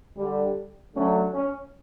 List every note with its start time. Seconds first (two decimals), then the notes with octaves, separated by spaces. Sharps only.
0.17 D3 G3
0.94 D3 F#3 A3 C#4
1.34 C#4